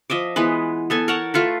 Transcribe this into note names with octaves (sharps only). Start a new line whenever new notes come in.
F3 D#5 E5 D6
E3 G#3 B3 B4
B3 A4 G#5
A#4 C#5 F#5 A5
A3 F4 A4 B4